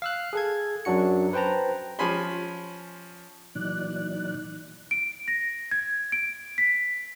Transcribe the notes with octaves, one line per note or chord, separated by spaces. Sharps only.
F5 E6 F#6
G#4 A4 G#6
F#2 F#3 D4 F#4 C#7
B4 C5 G5 A5 A#5
F3 C#4 G#5 B5 C6
A#2 E3 F#3 D#4 D5 F#6
D7
A#6
G#6
D7
B6